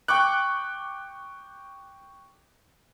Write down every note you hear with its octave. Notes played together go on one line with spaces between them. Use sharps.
G5 C#6 D6 F#6